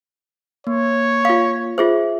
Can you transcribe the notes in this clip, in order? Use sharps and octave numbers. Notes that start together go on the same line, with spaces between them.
A#3 C#5
F4 F5
F4 G#4 C5 E5